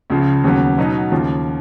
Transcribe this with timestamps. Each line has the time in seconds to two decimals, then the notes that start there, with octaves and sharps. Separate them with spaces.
0.10 C#2 C#3 F3
0.44 D#2 C#3 F#3 B3
0.78 B2 F#3 B3 D#4
1.11 D#2 C#3 F3